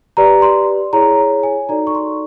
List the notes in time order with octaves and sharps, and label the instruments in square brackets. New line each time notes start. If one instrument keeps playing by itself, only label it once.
[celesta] G4 B4 D5 A#5
C6
E4 G#4 C#5 A#5
G#5
D#4 F#4 A4 D5 A#5
C#6
C6